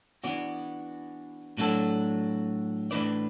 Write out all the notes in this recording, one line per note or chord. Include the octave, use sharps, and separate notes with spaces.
E3 B3 D4 F#4 D5
A2 F#3 D4 F#4 A4
A2 E3 D4 B4 D5